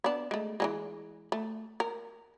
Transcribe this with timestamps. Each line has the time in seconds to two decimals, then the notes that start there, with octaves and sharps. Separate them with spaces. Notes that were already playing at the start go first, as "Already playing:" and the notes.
0.04 B3 D4
0.31 G#3 A3
0.60 E3 F#3 G#3
1.32 A3
1.80 A#4